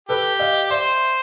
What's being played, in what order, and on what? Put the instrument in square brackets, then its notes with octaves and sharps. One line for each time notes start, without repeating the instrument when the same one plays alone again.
[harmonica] G4 [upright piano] A4 B4
[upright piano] D#5 F5
[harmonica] C5 [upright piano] D5 E5